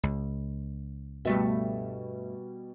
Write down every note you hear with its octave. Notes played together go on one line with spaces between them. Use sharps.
C#2
G2 B2 G3 A3 E5